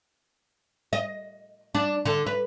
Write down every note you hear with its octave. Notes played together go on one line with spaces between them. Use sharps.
D#5
D4
D3
B4